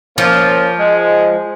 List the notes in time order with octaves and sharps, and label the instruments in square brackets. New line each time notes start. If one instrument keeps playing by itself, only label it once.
[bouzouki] F3 [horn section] A#3 C#4 F4
[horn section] G#3